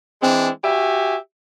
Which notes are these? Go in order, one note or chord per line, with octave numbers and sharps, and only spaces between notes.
E3 G#3 C4 D4
F#4 G4 E5 G#5